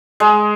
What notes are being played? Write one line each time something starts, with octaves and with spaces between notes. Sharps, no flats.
G#3